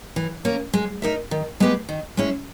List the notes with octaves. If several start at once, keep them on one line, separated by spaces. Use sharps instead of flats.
E3
A#3 C#4
G#3
D#4 A#4 E5
D#3
G#3 B3 G4 B4
D#3
G#3 C#4 E4